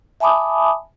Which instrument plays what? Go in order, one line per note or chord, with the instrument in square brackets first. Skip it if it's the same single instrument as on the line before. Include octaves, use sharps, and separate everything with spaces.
[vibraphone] E5 G#5 A5 B5 D6 D#6